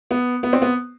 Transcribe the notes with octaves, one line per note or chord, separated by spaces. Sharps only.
B3
B3
C4
B3